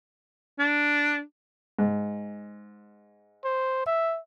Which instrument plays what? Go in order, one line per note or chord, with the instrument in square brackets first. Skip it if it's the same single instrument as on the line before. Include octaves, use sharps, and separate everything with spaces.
[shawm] D4
[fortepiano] G#2
[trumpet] C5
E5